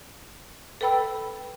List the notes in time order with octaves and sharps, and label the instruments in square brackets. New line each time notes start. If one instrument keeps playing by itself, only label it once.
[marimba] A4 B4 G5 B5 E6